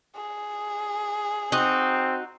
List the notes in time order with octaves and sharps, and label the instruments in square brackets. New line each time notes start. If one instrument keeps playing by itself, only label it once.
[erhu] G#4
[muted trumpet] C4 [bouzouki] D#4 F#4